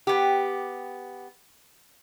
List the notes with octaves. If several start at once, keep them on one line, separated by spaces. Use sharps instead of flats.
B3 G4